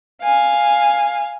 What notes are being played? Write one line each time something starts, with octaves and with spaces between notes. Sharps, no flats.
F5 G#5